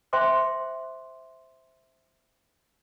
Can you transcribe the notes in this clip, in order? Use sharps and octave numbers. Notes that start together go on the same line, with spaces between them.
C5 E5 G5 C6 D6